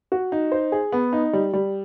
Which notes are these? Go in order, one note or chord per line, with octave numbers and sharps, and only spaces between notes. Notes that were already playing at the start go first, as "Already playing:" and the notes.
F#4
D#4
C5
G#4
B3
D#4
G3
G3